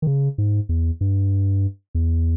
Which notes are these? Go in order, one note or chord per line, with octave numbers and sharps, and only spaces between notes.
D#3
C#3
G#2
E2
G2
E2